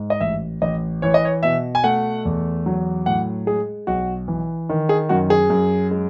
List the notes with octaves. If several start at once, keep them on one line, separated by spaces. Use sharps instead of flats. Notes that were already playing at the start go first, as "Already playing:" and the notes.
Already playing: G#2
D#5
A1 E5
A1 D#5
E3 C#5
D#5
C#5
B2 E5
G#5
A3 F#5
E2
F#3
A2 F#5
G#3 G#4
B1 F#4
E3
D#3
G#4
F#2 F#4
G#4
F#2
G#3